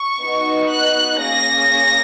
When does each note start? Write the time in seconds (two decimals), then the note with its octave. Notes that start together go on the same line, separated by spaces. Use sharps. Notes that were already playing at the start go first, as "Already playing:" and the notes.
Already playing: C#6
0.20 B3 D#4 F#4
0.70 F#6
1.21 A#3 C#4 G#4 A#6